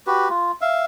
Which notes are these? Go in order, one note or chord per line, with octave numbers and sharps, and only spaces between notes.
F#4 G4 B4
F4
E5 F5